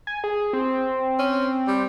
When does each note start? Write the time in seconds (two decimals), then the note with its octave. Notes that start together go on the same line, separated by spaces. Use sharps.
0.07 G#5
0.24 G#4
0.53 C4
1.19 C#4
1.67 G3